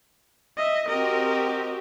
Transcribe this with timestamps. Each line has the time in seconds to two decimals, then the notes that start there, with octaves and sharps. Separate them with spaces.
0.57 D#5 E5
0.88 C4 F#4 G4 A#4 D#5